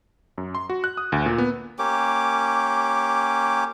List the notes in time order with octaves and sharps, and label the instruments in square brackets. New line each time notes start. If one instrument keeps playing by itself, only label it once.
[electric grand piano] F#2
C6
F#4
F#6
D#6
D2
A#2
B3
[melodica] A#3 C#4 G4 D6